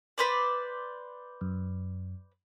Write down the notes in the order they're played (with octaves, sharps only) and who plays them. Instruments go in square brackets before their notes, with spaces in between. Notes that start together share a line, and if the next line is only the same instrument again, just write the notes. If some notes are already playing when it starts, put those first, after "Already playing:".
[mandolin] B4 C5 D5
[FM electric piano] F#2